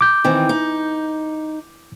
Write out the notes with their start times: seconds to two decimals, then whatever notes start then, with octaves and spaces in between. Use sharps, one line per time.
0.01 D6 G6
0.24 D#3 E3 C4
0.49 D#4